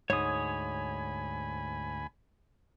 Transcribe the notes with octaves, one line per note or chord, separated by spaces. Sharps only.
D2 G#2 C#5 G#5 B5 D#6